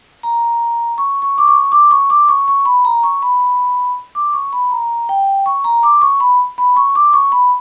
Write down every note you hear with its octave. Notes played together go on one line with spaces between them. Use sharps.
A#5
C#6
C#6
D6
C#6
D6
C#6
D6
C#6
C#6
B5
A#5
C#6
B5
D6
C#6
B5
A#5
G5
C#6
A#5
D6
C#6
B5
B5
C#6
D6
C#6
B5